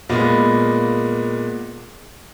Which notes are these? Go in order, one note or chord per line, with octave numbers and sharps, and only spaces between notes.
A#2 G#3 A#3 B3